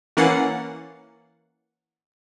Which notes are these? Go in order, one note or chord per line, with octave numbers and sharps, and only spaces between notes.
E3 A#3 C#4 F#5 A6 C7